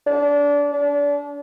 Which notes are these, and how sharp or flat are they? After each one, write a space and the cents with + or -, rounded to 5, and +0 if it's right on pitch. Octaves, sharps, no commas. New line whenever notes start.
D4 -25
D4 -35